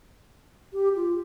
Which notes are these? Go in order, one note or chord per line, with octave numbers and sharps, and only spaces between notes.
G4
F4